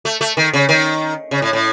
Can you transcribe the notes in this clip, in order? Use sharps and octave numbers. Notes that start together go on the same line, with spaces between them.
A3
A3
D#3
C#3
D#3
C#3
A2
A2